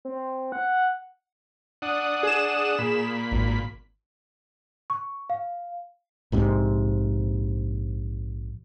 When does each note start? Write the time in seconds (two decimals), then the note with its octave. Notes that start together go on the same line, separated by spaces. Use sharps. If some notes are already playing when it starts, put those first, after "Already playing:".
0.05 C4
0.52 F#5
1.82 D4 F#5 D#6
2.23 G#4 E7
2.79 A#2 B5
3.31 G#1
4.90 C#6
5.30 F5
6.32 A#1 G#2 C3